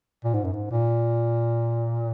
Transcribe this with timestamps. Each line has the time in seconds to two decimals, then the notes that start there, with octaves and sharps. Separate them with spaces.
0.24 A#2
0.34 G#2
0.44 F#2
0.53 G#2
0.71 A#2